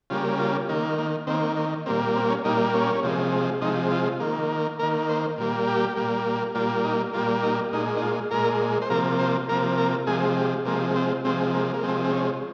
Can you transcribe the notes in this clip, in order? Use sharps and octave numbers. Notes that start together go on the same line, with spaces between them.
C#3 G3 A#3 F4
F4
D#3 A#3
A#3
D#3 A#3 C4
A#3
A#2 G3 A#3 C4
C4
C#4
A#2 G3 A#3 D#4
C#4
C3 F3 G#3
C3 F3 G#3 D#4
F4
D#3 A#3
D#3 A#3 A#4
C5
A#2 G3 A#3
G4
A#2 G3 A#3
A#2 G3 A#3 F4
D#4
A#2 G3 A#3 F4
D#4
A#2 G#3 D#4
D#4
F4
A#2 G#3 A#4
C5
C3 F3 A#3 A#4
C5
C3 F3 A#3 A#4
A#4
C3 F3 G#3 G#4
G4
C3 F3 G#3 A#3
C4
C3 F3 G#3 C4
A#3
A#3
C3 F3 G#3 C4
C4
C#4